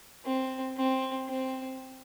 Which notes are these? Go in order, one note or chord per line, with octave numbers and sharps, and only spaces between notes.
C4
C4
C4